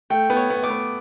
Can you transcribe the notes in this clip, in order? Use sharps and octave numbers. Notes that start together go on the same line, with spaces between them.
A3 G5
B3
C#5
B3
A3 D6
B3